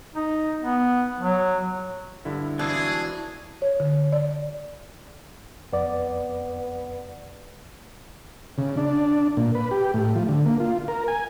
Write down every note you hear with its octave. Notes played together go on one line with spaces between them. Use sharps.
D#4
B3
F#3
G2 D3 E4
B2 E3 C4 D4 G#4
C#5
D3
D5
F2 B3 D5
C#3
D4
A#2
B4
G4
A2
F3
D3
A#3
F4
A#4
G#5